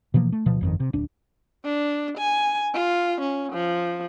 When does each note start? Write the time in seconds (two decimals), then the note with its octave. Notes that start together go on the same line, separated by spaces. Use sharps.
0.14 B2 E3 F3 A#3
0.32 A3
0.46 D1 B2 F3
0.61 G1 F2 D#3
0.80 C3
0.93 D1 D4
1.65 D4
2.18 G#5
2.75 F4
3.21 C#4
3.52 F3